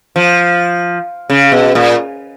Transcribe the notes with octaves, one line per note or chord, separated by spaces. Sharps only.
F3
C#3
B2
A#2